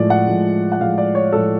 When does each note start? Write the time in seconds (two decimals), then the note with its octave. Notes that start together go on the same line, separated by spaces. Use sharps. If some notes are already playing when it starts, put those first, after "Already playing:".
Already playing: A2 F3 G#3 D5
0.10 F#5
0.27 A2 F3 G#3
0.72 F#5
0.80 A2 F3 G#3 F5
0.98 D5
1.15 C#5
1.33 A2 F3 G#3 A4